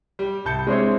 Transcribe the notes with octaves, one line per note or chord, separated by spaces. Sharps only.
G3
C2 A5 G6 C#7
G#3 C4 D4 E4 C5 C#5